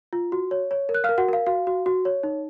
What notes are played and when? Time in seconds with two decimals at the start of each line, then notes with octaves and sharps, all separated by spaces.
0.13 F4
0.32 F#4
0.51 C#5
0.71 C#5
0.89 A#4
0.94 F#6
1.04 F5 F6
1.09 A#4
1.18 F#4 F#5
1.28 A#4 F5
1.47 F#4 F5
1.67 F#4
1.86 F#4
2.05 C#5
2.23 D#4